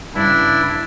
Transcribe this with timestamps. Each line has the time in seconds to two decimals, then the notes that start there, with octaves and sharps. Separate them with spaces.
0.15 G2 C#3 D4 E4